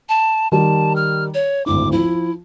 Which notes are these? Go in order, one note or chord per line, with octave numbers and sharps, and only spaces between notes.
A5
D#3 G3 A5
F6
C#5
G#1 D2 E4 D6
F3 E4